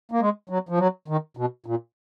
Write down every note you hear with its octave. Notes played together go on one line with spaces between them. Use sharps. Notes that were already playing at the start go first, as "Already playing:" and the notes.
A#3
G#3
F#3
F3
F#3
D#3
B2
A#2